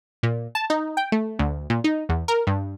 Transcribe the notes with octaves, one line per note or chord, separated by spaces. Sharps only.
A#2
A5
D#4
G5
A3
D2
A#2
D#4
E2
A#4
G2